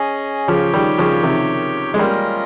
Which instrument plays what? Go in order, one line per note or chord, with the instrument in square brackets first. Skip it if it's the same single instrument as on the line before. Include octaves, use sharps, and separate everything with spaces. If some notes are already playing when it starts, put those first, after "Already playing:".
Already playing: [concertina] C#4 G#4 D#5
[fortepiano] C#3 F3 [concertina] G4 C#5 G5
[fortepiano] D#3 G3
C#3 F3
C3 D#3
G#3
[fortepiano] G3 A#3 [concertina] C#4 F4 A#4 D#5